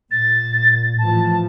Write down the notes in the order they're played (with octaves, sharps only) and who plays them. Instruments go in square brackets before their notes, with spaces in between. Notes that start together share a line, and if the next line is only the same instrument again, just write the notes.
[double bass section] A#2 [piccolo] A6
[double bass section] A2 E3 F3 [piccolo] A5